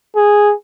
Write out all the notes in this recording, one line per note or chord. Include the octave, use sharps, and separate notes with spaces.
G#4